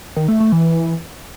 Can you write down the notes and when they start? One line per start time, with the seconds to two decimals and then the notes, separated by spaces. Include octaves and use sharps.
0.16 D#3
0.28 A3
0.40 A3
0.52 E3